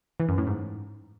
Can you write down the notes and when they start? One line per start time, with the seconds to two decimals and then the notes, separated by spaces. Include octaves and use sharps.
0.20 E3
0.29 F#2
0.38 A2
0.47 G#2